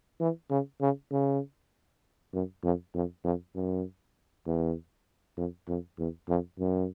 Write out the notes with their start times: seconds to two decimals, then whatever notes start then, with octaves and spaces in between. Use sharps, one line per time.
0.20 E3
0.50 C#3
0.81 C#3
1.12 C#3
2.33 F#2
2.63 F2
2.94 F2
3.24 F2
3.55 F#2
4.46 E2
5.37 F2
5.68 F2
5.98 E2
6.29 F2
6.59 F#2